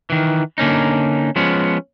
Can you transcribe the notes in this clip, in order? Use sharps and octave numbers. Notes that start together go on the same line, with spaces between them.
D#3 E3
D3 A#3 C#4 D#4
F3 G#3 B3 C#4